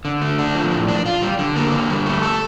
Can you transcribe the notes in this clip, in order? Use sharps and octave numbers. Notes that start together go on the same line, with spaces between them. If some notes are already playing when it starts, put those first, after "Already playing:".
D3
A3
D4
F3
A2
D4
F4
G3
D3
A#3
D3
G3
A3
A4